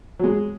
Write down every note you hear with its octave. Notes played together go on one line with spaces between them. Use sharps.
F#3
G#3